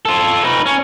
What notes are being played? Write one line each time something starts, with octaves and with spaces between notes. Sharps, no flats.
F4 A4
D#4 B4
C#4